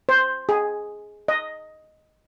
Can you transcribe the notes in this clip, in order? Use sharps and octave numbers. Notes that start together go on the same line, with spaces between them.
C5
G#4
D#5